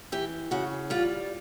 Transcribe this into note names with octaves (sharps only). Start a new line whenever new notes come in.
E3 G4
C#3 F#4
G3 F4